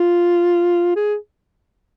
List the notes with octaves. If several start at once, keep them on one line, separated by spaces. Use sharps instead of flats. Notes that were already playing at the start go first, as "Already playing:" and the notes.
Already playing: F4
G#4